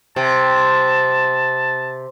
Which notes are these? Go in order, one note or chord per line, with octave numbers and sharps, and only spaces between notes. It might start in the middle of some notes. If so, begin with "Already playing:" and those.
C3 A5